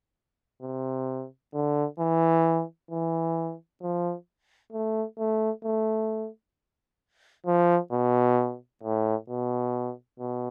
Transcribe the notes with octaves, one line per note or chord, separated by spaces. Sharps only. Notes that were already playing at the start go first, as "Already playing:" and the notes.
C3
D3
E3
E3
F3
A3
A3
A3
F3
B2
A2
B2
B2